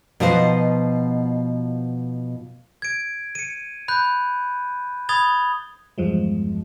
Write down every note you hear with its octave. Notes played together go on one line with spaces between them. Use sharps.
B2 F3 D#4 B4 C5 D#5
G#6 D7
C#7 D#7
B5 F#6 G6
B5 D#6 G#6 A6 F7 G7
E2 G2 F3 G#3